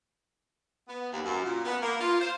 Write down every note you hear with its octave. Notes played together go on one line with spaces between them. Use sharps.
B3
D#2
F#2
A#2
B3
A#3
F4
C5